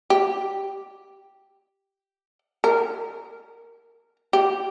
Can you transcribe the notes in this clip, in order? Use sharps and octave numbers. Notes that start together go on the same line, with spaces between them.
G4
A#4
G4